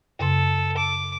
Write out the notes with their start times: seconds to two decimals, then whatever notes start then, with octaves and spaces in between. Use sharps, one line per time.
0.19 F#2 C#3 A4 C6
0.77 D6